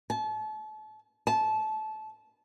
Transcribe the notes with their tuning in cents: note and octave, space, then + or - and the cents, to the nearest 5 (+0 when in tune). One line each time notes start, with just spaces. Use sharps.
A5 -35
A5 -20